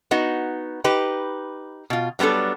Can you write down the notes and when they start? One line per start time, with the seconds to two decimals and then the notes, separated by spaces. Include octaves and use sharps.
0.11 B3 D#4 F#4
0.84 D#4 G4 B4
1.90 B2 F4
2.19 F#3 G3 B3 D4 A4